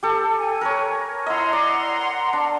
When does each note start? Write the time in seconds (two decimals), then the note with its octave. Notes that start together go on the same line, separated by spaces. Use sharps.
0.03 G4 A4
0.37 G#5
0.61 A#4 B4 C#5
1.26 E4 D#5 F#5 A#5 C6
1.53 D5
2.33 D4